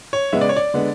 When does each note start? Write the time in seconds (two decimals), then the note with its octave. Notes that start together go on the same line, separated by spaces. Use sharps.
0.13 C#5
0.33 C#3 G#3 B3 E5
0.41 D5
0.49 C#5
0.56 D5
0.74 D3 G#3 B3